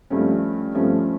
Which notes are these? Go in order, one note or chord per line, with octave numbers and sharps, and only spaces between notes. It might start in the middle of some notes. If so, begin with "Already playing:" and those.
G2 F3 A3 C#4
G2 F3 A3 C#4